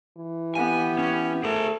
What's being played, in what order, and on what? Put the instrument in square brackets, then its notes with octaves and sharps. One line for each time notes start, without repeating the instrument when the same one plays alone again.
[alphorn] E3
[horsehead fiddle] B3 G4 [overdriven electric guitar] G#5
[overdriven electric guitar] C#4
[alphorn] A3 [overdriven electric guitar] G#4 A#4